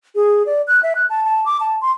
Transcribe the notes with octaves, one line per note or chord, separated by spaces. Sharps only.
G#4
D5
F#6
E5
F#6
A5
A5
D6
A5
C6